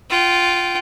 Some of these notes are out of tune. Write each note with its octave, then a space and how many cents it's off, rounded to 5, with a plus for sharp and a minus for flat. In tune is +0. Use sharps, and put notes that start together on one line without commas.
F4 +0 G5 -30